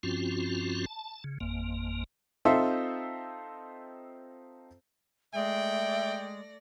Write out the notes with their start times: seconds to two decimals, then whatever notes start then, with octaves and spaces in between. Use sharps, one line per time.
0.03 G2 F3 C4 C#4 F4 F#4
0.86 A5
1.24 C#3
1.41 G#1 F2 A#3
2.45 C4 D#4 F4 A4 C5 E5
5.34 G#3 A3 D5 E5 G5 A#6